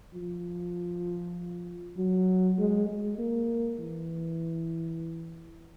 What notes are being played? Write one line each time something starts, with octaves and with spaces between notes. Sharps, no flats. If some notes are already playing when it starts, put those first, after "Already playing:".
F3
F#3
G#3
G#3
A#3
E3